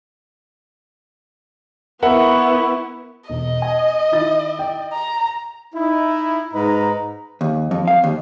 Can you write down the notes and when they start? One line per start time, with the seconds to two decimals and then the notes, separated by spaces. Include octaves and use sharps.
2.03 B3 E4 A#4 E5 F#5 B5 C#6
3.30 E1 D#5
3.62 G#5
4.12 D#3 E4 A6
4.59 G5
4.93 A#5
5.75 D#4 E4
6.53 G#2 D#4 B4 A#5
7.41 D#2
7.71 F2
7.88 F5
8.04 D#2